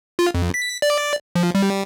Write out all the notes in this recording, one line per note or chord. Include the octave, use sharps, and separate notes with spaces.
F4
F2
B6
D5
F3
G3